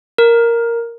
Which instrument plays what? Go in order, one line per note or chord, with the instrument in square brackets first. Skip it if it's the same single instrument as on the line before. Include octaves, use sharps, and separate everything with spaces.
[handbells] A#4